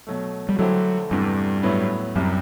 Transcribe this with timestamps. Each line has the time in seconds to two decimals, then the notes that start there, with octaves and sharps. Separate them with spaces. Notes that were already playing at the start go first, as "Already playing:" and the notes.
0.07 B2 F#3 A3
0.49 G3
0.59 D3 F#3 A3 E4 G4 C5
1.11 E2 G2 C3 E3 A3
1.63 A2 F#3 B3 E4 B4
2.16 C2 F#2 C3 G3